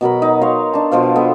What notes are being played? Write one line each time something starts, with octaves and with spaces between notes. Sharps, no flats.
B2 F#3 A#4 B5
D#4
C#5 F5 C6
D4 A5
B2 F3 C5 F5
B3 F4 A4